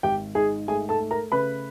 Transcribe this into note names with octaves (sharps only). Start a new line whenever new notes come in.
G#1 G4 G5
G#2 G#4 G#5
A3 G#4 G#5
A4 A5
A3
A#4 A#5
C#3 B4 B5